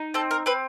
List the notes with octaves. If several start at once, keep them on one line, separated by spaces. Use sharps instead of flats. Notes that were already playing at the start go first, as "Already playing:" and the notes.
Already playing: D#4
C4 A4
A#4
C4 B4